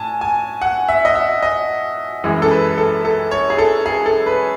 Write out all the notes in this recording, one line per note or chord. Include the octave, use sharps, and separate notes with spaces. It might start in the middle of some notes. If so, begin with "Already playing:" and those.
Already playing: A2 G#5 A5
G#5
F#5
E5
D#5
E5
D#5
F#2 E3 G#3
A4
B4
A4
A4
C#5
G#4
A4
G#4
A4
B4